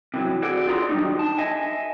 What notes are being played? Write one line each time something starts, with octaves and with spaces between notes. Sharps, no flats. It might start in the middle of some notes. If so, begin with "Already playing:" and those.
C3 E3 F#3
F#4 G#4 A4 D5 F#5
F4 G#4 D5 A#5 C6
D#3 F#3 G3 C4 D4 D#4
A5
D#5 E5 G#5